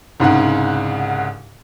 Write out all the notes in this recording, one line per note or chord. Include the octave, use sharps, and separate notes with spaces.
C2 G#2 C#3 F#5